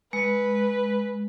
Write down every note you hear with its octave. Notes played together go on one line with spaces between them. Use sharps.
G#3 B4